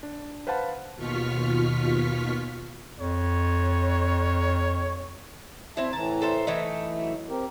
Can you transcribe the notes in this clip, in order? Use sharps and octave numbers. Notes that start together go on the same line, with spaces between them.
D4
B4 C5 F5 F#5 A5 B5
D#2 B2 F4 C#6 F6 B6
F2 C#5
C4 E4 E5 A5
A2 E3 A5 A#5
A4 C5 E5
E3 A3 D#4 A4
F#3 E5
C4 G4 A#4